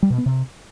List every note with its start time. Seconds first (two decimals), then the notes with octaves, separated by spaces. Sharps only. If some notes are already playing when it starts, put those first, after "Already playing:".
0.03 G3
0.10 B2
0.18 B3
0.26 C3